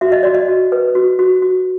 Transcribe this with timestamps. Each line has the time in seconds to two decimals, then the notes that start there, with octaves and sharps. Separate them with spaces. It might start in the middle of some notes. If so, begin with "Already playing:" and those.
0.01 F#4 E5
0.12 D#5
0.23 F#4 D5
0.35 D#5
0.48 F#4
0.72 B4
0.95 F#4
1.19 F#4
1.42 F#4